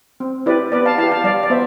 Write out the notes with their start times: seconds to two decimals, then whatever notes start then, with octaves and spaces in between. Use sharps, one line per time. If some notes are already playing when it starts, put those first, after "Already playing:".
0.20 C4
0.46 E4 G4 B4 D5
0.72 B3 B4 D5
0.85 F5 A5
0.98 E4 F5 A5
1.03 G4
1.12 F5 A5
1.24 G3 D5 F5
1.43 D5
1.50 B3 C5 E5